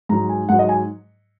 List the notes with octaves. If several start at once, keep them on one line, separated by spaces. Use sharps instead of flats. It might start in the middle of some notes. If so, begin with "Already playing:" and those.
G#2 F#3 A#5
G#5
G#2 F#3 F#5
D#5
G#5